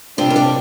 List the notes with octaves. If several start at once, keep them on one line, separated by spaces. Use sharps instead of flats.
C3 G3 C4 D4 F4
A#4
D4 G4